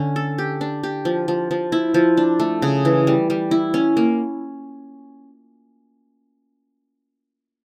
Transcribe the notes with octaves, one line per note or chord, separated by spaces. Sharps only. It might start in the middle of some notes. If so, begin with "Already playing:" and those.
Already playing: D3 C#4
A4
G4
D4
G4
F3
F3
F3
E4
F3
D4
A3
C#3
E3
G3
G3
E4
C#4
A#3